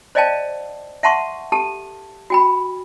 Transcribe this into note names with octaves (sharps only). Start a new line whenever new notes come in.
C5 D5 D#5 F5 G5 A5
E5 F#5 A5 C6 C#6
G4 A4 A5
F#4 G5 B5